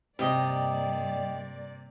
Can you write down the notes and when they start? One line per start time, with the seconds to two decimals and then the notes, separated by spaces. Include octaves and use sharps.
0.19 G2 C3 A#3 G4 D5 D#5